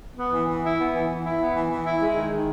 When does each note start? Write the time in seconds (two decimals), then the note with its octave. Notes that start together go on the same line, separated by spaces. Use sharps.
0.18 B3
0.33 E3
0.48 E3
0.64 E4
0.79 B3
0.94 E3
1.09 E3
1.25 E4
1.40 B3
1.55 E3
1.71 E3
1.85 E4
2.01 G#3
2.16 D#3
2.32 D#3